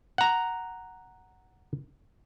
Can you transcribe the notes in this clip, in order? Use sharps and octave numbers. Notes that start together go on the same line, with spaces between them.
F#5 A#5